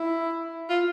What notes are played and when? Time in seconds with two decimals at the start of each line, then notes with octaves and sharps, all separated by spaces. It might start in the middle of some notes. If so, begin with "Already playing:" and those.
Already playing: E4
0.69 F4